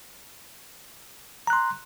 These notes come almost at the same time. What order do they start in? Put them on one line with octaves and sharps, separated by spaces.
A#5 F#6 C6